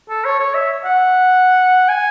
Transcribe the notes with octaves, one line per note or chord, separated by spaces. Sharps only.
A4
C#5
C#5
E5
F#5
G#5